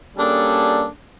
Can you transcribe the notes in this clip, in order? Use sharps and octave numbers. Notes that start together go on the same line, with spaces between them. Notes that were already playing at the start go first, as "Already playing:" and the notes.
G3 A#3 C#4 D4 G#4 A4